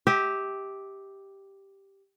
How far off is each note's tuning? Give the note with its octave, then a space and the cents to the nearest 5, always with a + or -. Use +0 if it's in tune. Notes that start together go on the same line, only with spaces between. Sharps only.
G4 +0 E5 -40